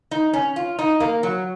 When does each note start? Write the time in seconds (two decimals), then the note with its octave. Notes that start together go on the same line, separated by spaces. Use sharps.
0.11 D#4
0.33 C#4
0.56 F4
0.79 D#4
1.00 A#3
1.23 F#3